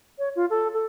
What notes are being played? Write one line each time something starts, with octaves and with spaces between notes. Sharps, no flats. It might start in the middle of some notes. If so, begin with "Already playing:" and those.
C#5
F4
A4
A4